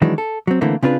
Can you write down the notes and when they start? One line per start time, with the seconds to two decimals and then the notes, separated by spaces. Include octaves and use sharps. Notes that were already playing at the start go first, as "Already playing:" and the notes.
0.02 D#3 E3 F#3 G#3 D4
0.18 A4
0.47 F#3 C4
0.61 D3 E3 A3 A#3 C4
0.83 C#3 C4 D4 F4 B4